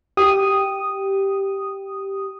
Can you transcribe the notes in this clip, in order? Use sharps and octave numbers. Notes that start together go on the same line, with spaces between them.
G4 D#6